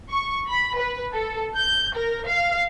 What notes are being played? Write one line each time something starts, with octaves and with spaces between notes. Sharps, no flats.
C#6
B5
B4
A4
G6
A#4
F5